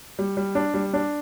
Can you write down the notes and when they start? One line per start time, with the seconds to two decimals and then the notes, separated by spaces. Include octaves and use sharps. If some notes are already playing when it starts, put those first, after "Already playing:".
0.19 G3
0.37 G3
0.55 D4
0.74 G3
0.93 D4